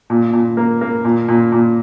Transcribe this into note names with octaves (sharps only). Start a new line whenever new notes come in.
A#2
A#2
A#3
A#3
A#2
A#2
A#2